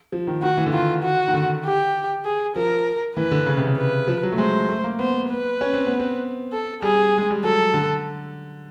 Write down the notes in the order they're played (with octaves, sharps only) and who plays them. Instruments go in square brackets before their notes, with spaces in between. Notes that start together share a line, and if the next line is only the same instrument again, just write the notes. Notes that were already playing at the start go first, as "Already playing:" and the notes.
[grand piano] F3
D#3
[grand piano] D#3 [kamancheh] F#4
[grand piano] E3
D3
[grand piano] D#3 [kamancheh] F4
[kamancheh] F#4
[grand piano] D#3
D3
[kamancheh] G4
G#4
[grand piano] F3 [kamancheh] A#4
[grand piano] E3 [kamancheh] B4
[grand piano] D3
C#3
C3
C#3
[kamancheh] B4
[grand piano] F3
F#3
A3
[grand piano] G#3 [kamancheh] C5
[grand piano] A3
A#3
[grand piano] B3 [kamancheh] C5
[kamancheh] B4
[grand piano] C#4
C4
B3
C4
[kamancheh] A4
[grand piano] G3 [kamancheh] G#4
[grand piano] G#3
G3
[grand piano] F#3 [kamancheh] A4
[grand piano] D3